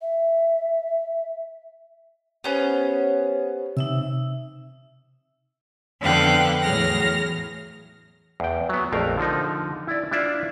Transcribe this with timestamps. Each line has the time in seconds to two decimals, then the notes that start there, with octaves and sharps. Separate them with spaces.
0.02 E5
2.44 B3 C#4 G4 C5 C#5
3.77 C3 D#4 E5 E6
6.01 F2 D3 B3 F5 G5 F#6
6.62 E2 A2 F#3 G#4 F6 A#6
8.40 E2 G5
8.69 F#3 B3
8.92 A#1 F2 A3 A#4 F5
9.17 D3 F3 D#4
9.87 E4 D5
10.11 D4 E4 F4 D5 E5